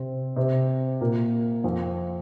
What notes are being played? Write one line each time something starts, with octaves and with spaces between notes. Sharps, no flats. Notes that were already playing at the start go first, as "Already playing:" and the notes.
Already playing: C3 C4
C3 C4
A#2 A#3
F2 F3